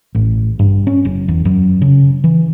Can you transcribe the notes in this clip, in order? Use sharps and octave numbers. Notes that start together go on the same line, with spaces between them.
A1
G2
C#4
F#1
E2
F#2
C#3
E3